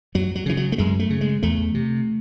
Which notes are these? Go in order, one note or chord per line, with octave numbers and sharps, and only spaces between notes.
F#2 F#3
F#3
C#3 E3
F#3
A3
F#2 G#3
A3
C#3
G#3
E2 A3
C3